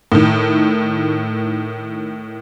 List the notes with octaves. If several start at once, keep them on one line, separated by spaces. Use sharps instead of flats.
A2 D#3